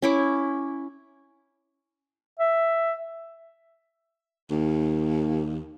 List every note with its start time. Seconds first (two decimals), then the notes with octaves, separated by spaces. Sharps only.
0.02 C#4 E4 D6
2.39 E5
4.51 D#2